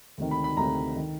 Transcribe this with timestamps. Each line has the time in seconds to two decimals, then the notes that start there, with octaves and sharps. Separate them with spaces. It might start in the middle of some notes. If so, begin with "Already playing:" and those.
0.18 D2 C3 D#3
0.31 B5
0.44 B5
0.57 D2 C3 D#3 A#5
0.96 D#3